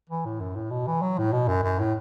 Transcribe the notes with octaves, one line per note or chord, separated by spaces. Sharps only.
E3
A2
F#2
A2
B2
E3
F#3
A2
B2
F#2
F#2
A2